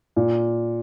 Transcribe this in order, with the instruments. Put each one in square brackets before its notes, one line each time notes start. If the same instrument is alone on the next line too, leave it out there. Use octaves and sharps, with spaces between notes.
[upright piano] A#2